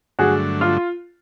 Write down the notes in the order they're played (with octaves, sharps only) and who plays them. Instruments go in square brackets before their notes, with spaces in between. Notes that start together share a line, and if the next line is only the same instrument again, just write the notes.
[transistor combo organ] G2 D3 F#3 A3 D4 [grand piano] F#4 G#4
[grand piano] F4